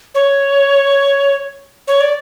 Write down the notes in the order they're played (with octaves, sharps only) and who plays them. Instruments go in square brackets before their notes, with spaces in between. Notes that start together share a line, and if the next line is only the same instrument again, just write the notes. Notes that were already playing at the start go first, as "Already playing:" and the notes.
[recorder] C#5
C#5
D5